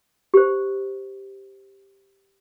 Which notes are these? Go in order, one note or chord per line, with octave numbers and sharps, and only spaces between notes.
G4 C5